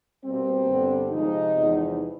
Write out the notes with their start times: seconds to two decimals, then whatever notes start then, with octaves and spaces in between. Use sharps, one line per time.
0.24 B2 G3 A#3 C4
0.67 G2 D3 G3 B3
1.10 C3 F3 G#3 D#4
1.53 E2 C3 F3 G#3 B3